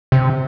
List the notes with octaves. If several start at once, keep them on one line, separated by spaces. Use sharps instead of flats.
C3